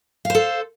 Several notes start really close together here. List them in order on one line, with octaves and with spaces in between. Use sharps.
F5 C5 A4